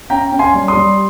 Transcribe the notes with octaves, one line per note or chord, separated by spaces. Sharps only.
C#4 G5 A#5
C#4
G#5 C6
G3
C6 D#6
G3